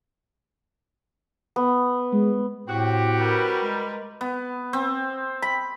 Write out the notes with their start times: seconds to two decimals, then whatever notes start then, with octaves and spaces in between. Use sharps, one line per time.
1.56 B3
2.13 G#3
2.68 A2 C4 F#4 G4
3.20 G3 A#4 B4
3.61 G#3
4.21 B3
4.73 C4
5.42 B5